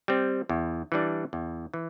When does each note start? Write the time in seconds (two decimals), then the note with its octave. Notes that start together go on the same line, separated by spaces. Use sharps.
0.08 G3 C4
0.49 E2
0.92 E3 G3 D4
1.33 E2
1.74 E3